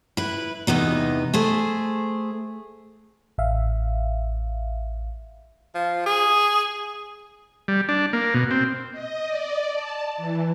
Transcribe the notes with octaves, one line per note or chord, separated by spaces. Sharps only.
E4 B4
E2 C3 B3 D#4
A3 G#4 C5
A1 E5 F5
F3
G#4
G3
D4
A#3
B2
C4
D#5
D5
A5
E3